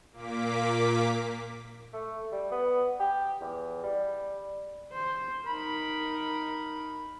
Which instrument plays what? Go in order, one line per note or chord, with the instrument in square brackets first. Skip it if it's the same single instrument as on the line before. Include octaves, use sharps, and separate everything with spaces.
[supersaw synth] A#2 A#3 D6 B6
[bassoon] A3
G3
B3
G4
E2
G3
[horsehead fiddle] C5
[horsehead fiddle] D#4 A#4 [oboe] B5